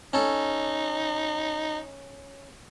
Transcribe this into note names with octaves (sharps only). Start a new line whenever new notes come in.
C#4 D#4 A4